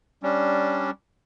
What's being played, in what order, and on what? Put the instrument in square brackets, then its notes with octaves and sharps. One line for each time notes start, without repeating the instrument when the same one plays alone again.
[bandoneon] G3 C#4 D4